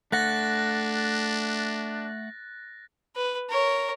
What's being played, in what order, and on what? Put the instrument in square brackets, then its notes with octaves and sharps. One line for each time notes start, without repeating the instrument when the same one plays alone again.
[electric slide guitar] A3 F#5 [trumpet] D4 [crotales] F#6 A6 A#6
[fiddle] B4
A#4 C#5